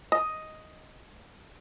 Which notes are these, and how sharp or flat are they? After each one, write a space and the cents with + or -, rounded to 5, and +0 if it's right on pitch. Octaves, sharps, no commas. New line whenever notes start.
D#5 +5